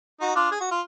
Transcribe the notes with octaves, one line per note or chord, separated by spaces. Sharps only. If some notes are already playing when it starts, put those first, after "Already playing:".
D#4 F#4
D4 F4
G#4
F#4
F4